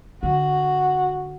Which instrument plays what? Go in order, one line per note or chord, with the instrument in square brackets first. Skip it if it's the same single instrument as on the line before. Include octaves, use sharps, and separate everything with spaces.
[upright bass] D3 [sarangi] F#4